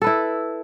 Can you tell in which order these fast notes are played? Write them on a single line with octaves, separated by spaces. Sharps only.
A4 B4 E4